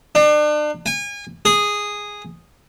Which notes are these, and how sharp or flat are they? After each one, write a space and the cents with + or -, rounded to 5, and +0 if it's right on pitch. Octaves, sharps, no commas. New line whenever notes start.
D4 +35
G#5 -35
G#4 -5